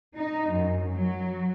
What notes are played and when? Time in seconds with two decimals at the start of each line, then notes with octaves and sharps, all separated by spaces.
0.15 D#4
0.49 F#2
0.94 F#3